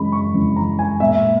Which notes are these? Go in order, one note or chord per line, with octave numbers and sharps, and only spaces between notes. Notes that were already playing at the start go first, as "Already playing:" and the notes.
Already playing: F#2 C#3 E3 G#3 B5
C#6
F#2 C#3 E3 G#3
A#5
G#5
A#2 G#3 B3 E5